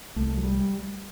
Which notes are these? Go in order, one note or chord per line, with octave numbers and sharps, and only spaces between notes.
C2 A3
F#3
G3